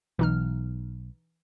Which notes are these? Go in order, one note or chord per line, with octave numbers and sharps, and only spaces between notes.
B1 E3 D#4 F6